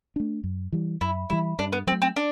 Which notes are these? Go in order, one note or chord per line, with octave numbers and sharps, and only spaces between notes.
A3 D4
F#2
E3 G3
F#2 E4
E3 G3 E4
G2 D4
B3
F#3 A3 C4
C4
D4